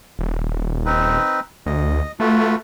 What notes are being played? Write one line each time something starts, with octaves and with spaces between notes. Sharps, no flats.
D#1
C4 D#4 B4
D2 D#5
A3 F4 F#4 B4